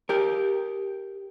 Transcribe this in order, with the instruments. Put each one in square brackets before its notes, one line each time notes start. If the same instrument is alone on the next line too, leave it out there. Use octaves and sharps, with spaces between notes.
[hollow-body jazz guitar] G4 A#4